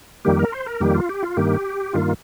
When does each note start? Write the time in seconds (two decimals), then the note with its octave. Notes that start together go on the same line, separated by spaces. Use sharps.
0.25 F2 D#3 G3 A#3 G4
0.39 A#4
0.52 C5
0.66 A#4
0.80 F2 D#3 G3 A#3 G4
0.94 F4
1.09 G4
1.23 F4
1.37 G2 D#3 A#3 G4
1.93 G2 D#3 A#3 F4